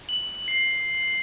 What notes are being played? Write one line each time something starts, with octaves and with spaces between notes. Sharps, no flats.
F#7
C7